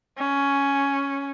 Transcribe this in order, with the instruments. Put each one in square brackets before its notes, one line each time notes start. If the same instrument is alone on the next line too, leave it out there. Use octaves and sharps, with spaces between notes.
[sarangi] C#4